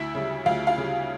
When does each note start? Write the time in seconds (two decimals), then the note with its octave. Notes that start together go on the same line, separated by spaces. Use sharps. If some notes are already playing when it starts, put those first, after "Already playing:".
Already playing: D2 E4 E5
0.15 C#3 G3
0.46 D2 F4 F5
0.67 F4 F5
0.78 C#3 G3